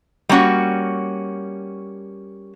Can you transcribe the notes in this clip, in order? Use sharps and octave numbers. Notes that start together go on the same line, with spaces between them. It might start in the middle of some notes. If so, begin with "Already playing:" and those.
G3 A#3 C#4 F#4